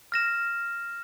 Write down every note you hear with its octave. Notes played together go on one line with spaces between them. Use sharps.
F6 A#6 E7